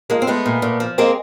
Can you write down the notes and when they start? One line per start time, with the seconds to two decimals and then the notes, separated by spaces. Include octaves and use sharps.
0.10 F3 G#3 A#3
0.22 C4
0.27 G#3 A3 B3
0.46 A#2
0.62 A#2
0.80 F3
0.98 G#3 A#3 C4